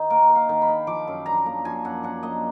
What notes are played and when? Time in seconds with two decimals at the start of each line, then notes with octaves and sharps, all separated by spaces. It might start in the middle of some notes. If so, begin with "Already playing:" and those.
Already playing: D#3 D#4
0.10 A#3 A#4
0.29 D#3
0.35 F5
0.49 D#3
0.62 B5
0.68 D#4
0.87 F3 D6
1.08 F#2
1.26 D4 A#5
1.46 A#3
1.65 F3 G#5
1.85 F#2 F#5
2.03 D4 F#5
2.23 A#3 D#5